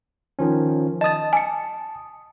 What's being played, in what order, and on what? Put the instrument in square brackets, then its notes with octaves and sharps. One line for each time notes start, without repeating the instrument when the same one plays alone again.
[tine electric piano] D#3 F3 C#4
[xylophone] D#5 A6 [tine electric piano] A5 D#6
[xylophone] G#5 C#7